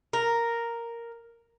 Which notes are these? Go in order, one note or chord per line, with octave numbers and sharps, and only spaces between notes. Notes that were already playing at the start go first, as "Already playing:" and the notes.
A#4